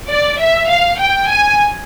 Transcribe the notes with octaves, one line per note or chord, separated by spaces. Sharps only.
D5
E5
F5
G5
G#5